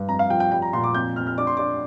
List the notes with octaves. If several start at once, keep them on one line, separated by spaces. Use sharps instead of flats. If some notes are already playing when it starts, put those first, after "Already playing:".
Already playing: G2
F2 A#5
F5
F3 G5
G5
G3 G5
A#5
A#2 C6
D6
F2 G6
F2 F6
F6
D4 D6
C6
D4 D6